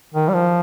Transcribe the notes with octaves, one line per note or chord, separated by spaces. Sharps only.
D#3
G3
F3